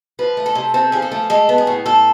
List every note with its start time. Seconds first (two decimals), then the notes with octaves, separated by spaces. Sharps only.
0.19 F3 B4
0.37 A3
0.46 A4
0.55 C3
0.74 C4 A4
0.92 F3 G#4
1.02 A4
1.12 A3
1.30 G#3 A4
1.49 B3
1.58 G#4
1.67 A2
1.86 A2 A4